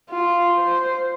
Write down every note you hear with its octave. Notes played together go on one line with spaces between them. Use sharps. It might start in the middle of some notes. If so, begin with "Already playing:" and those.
F4
C5